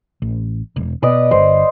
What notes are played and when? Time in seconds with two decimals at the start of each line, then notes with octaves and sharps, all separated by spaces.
0.22 A1
0.76 E1
1.03 B2 B4 D5 D#5
1.31 G1 C5